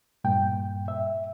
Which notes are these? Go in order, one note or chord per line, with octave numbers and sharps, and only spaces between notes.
G2 A#2 G5
E5